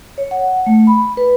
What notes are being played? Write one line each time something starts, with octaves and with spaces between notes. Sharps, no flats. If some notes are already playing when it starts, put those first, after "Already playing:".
C#5
F#5
A3
B5
B4